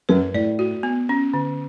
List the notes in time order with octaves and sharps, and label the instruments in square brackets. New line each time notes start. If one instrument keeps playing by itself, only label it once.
[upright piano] F#2 [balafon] B4
[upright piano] A2 [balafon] D5
[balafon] F#4
B3
C#4
D3